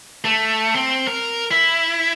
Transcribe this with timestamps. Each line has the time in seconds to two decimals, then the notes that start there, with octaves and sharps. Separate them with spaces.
0.25 A3
0.75 C4
1.07 A#4
1.51 E4